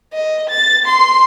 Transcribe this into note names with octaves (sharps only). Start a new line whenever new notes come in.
D#5
A6
C6